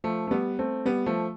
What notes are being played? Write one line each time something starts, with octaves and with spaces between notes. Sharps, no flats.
F3 A3
A3
G3 B3
A3 C4
G3 B3
F3 A3